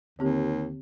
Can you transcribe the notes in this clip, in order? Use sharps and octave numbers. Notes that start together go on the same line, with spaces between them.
D#2 D3 C4 G4